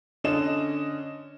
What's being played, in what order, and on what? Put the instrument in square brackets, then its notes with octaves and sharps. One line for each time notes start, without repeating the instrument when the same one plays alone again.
[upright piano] D3 C#4 D#5 E7